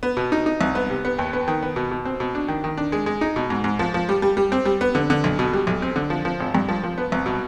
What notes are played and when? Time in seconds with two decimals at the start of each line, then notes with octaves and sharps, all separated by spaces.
0.03 B3
0.17 B2
0.32 D#4
0.46 D#4
0.61 C2
0.75 B3
0.90 C3
1.05 B3
1.19 D#2
1.33 B3
1.48 D#3
1.63 B3
1.76 B2
1.91 B2
2.05 C4
2.20 B2
2.35 D4
2.48 D#3
2.64 D#3
2.77 D4
2.92 G#3
3.06 G#3
3.21 D#4
3.36 B2
3.50 G#2
3.64 G#2
3.79 F3
3.94 F3
4.09 G3
4.22 G3
4.37 G3
4.52 C4
4.65 G3
4.81 B3
4.95 D3
5.10 D3
5.24 B1
5.39 B2
5.53 G3
5.67 B1
5.82 C4
5.96 D3
6.10 F3
6.25 F3
6.40 G#1
6.55 G2
6.68 F3
6.83 F3
6.98 B3
7.12 C2
7.26 B2